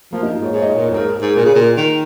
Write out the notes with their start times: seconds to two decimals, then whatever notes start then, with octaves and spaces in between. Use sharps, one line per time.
0.12 F3 A#3
0.23 D#4
0.33 F4
0.40 G#2 C#5
0.53 G#2 C#5
0.62 D#5
0.71 A#2 C#5
0.90 F2
0.94 G#2 A#4
1.15 A#4
1.22 G#2
1.36 A#2 G#4
1.45 C#3
1.55 A#2
1.77 D#3